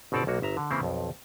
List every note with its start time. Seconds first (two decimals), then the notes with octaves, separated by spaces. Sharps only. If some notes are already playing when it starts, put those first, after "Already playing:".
0.12 G1 B2 C4 A4 D5 A5
0.27 B1 A#3 F#4
0.42 G1 E5 A#5
0.57 D3
0.71 C#3 E3 A#3 C4 E4 C5
0.83 B1 F2